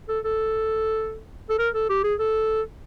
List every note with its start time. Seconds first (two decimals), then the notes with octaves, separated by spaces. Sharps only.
0.09 A4
0.24 A4
1.50 A4
1.59 A#4
1.75 A4
1.89 G4
2.04 G#4
2.19 A4